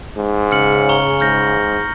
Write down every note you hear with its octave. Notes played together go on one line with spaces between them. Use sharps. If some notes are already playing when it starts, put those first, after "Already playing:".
G#2
C#3 F6 C#7 F#7
A#5 C#6 G7
G#2 F6 G6 A#6